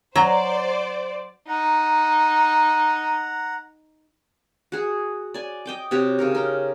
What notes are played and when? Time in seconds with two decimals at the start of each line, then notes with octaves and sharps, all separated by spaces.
0.16 F#3 C5 D5 A#5
1.48 D#4 F#5 A#5
4.72 F#4 G#4
5.34 D5 G#5
5.66 D#5 G5 D6
5.91 C3 F#4 G4 C#5
6.19 C#3 D#4 A#4
6.35 A#4 G5